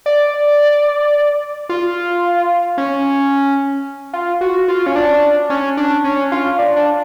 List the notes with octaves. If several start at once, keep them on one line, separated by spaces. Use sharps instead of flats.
D5
F4
C#4
F4
F#4
F4
C#4
D4
C#4
D4
C#4
F4
D4
D4